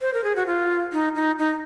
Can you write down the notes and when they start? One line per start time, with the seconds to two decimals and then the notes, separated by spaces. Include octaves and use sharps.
0.01 C5
0.14 A#4
0.24 G#4
0.36 F#4
0.47 F4
0.93 D#4
1.15 D#4
1.39 D#4